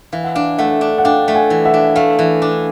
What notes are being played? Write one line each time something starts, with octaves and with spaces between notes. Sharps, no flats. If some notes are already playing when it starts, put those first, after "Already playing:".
E3 F5
F#5
D4 F5
A3 E5 F#5
D4
F#5
D4 F5 G5
A3
F#5 G#5
E3
E5 F#5
D4
A3 F5
E3
D4